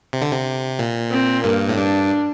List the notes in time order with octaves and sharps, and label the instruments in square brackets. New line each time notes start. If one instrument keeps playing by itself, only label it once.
[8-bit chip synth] C3
D3
C3
A#2
[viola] C4
[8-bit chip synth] G2 [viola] A#3
[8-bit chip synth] A2
[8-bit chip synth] G2 [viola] D4